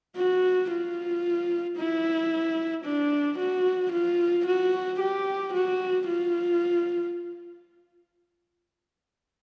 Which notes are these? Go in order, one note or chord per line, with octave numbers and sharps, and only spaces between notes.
F#4
F4
E4
D4
F#4
F4
F#4
G4
F#4
F4